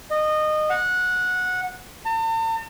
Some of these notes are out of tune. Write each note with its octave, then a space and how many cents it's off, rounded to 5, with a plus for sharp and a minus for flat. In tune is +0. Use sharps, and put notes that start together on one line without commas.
D#5 -20
F#5 -15
A5 +45